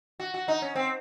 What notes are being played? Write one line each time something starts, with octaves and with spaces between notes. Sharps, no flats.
F#4
F#4
D#4
C#4
C4